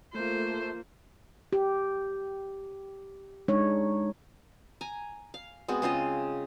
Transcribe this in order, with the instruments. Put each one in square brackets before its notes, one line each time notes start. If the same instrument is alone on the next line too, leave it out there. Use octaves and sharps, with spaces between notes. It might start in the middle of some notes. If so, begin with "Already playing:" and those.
[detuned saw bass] A3 [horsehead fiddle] A#3 F4 [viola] C5
[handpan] G4
G#3 D4 D#4 C#5
[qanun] G#5 A#5
F5
G#3 B3 C4 F#4
C#3 C4 F4 D#5